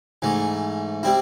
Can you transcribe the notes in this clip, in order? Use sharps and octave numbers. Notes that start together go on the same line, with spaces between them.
G#2 E3 A3
G3 C4 E4